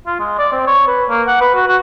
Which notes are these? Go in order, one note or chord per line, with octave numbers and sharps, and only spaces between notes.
F4
G#3
D5
C4
C#5
B4
A#3
F#5
B4
F#4
F#4